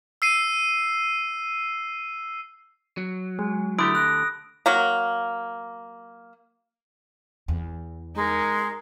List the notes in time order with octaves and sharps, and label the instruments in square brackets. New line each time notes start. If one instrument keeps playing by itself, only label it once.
[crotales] E6 C7 D#7
[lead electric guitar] F#3
[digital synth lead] G#3
[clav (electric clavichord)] D3 A3 G4 [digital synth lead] E4 [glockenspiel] B5 D#6 D7
[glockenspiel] F#6 [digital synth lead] A#6
[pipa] F#3 A#3
[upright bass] E2
[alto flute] G#3 [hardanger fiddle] D#4 A#4